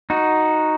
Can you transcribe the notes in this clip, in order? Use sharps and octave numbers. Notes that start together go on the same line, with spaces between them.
D#4 F#4